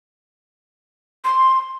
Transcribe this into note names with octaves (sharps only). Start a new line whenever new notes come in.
C6